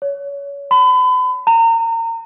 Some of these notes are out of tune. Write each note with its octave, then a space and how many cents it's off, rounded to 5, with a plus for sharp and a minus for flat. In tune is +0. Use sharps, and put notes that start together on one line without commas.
C#5 +25
B5 +35
A#5 -30